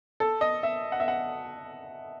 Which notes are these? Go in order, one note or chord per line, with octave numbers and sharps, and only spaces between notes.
A4
D#5
E5
F#5
E5
F#5